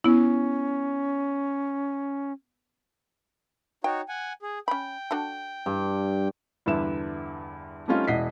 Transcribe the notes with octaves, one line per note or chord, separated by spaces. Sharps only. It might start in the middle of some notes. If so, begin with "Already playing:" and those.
B3 C#4 E4
D#4 F#4 C#5 G5
F#5 G#5
G#4
C#4 G5 B5
D4 F#4 A4
G2
E2 G2 D3 B4 E5 E7
G3 A3 C4 C#4 D#4 F4
E1 E4 D#5 F#5 B6 C7